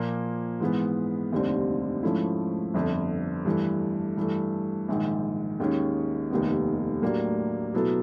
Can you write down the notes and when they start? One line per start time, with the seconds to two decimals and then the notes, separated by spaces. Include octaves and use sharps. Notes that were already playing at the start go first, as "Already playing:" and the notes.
Already playing: A#2 F3 A#3
0.60 G#2 E3 G#3 B3
1.32 F1 D#2 D3 G3 C4
2.03 G#2 F3 A3 C#4 E4
2.74 G1 F2 D3
3.45 G2 E3 A3
4.18 G2 E3 A3
4.88 A#1 G#2 D#3
5.60 D#2 D#3 G#3 C#4
6.30 F1 D#2 D#3 G3 B3
7.02 A2 F#3 A#3 D4 G4
7.74 B2 F#3 B3 E4 A4